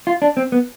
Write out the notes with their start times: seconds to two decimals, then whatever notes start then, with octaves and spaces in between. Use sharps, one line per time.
0.07 F4
0.22 D4
0.37 C4
0.52 B3